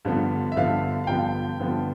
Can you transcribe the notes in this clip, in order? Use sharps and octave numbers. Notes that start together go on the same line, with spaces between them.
G2 D3 F3 B3
E5
G2 D3 F3 B3 F5
F5
G2 D3 F3 B3 G5
G2 D3 F3 B3